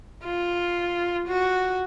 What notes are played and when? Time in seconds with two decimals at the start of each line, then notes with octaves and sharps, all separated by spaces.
0.24 F4
1.28 F#4